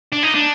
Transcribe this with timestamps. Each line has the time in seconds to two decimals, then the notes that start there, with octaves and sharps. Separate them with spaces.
0.13 D4
0.23 D#4
0.35 D4